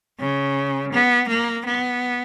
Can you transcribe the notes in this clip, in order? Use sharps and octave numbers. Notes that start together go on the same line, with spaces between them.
C#3
B3
A#3
B3